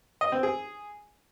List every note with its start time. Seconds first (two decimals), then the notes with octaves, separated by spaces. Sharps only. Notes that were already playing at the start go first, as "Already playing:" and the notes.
0.21 D#5
0.32 C4
0.43 G#4